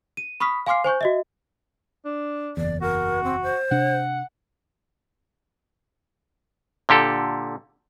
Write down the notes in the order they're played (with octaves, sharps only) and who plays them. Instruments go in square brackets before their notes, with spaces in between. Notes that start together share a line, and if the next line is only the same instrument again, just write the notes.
[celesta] D#7
B5 C#6 D#6 F6 B6
F5 G#5 C6 D6 F6 C7
C5 G#5 C#6 G6
F#4 D#5 E5
[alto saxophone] D4
[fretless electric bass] F#1 E2 [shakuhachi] D5
[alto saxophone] F#4 [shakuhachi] A#4
[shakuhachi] C4
C5
[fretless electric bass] C3 D4 [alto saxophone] F#5
[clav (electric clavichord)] A#2 D3 G4 A4